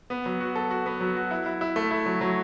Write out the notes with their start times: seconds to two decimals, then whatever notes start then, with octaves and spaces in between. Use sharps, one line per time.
0.10 B3
0.26 F#3
0.40 F#4
0.56 A4
0.70 F#4
0.86 B3
1.01 F#3
1.16 F#4
1.31 E4
1.46 E4
1.61 E4
1.76 A3
1.91 E4
2.06 F#3
2.21 F#3